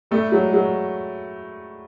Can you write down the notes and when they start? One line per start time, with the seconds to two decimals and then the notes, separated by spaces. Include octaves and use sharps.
0.11 G3 A3
0.32 F#3 G#3
0.53 F#3 G#3